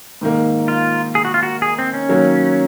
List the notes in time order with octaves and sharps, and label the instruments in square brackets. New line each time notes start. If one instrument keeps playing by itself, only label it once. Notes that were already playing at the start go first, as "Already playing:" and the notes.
[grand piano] G#2 D#3 A#3
[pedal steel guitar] F4
G#4
F#4
F4
F#4
G#4
C4
C#4
[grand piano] D#3 F#3 A#3